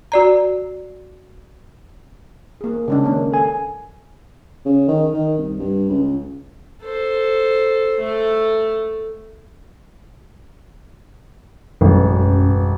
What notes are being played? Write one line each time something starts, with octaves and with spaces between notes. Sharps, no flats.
F#4 D5 A#5
A#3 G#4
C#3 G#3 D4
D#3 A#3 C#4
A4 G#5
C#3
D#3
D#3
C2
G2
C#2
A4 C5
A3
E1 A1 F#2